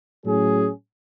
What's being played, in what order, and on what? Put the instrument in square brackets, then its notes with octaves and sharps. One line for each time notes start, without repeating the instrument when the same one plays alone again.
[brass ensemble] A2 F#3 C#4 G#4